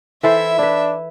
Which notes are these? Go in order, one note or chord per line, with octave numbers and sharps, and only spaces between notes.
E3 E4 A4 C5 E5
D4 E4 B4